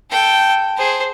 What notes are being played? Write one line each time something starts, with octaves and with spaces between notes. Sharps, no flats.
A4 G5
G#4 C5